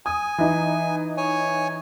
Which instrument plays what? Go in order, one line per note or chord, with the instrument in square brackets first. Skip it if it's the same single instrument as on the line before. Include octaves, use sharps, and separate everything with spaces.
[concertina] G#5 [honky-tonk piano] D#6
[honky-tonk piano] E3 D#4
[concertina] C#5 G#5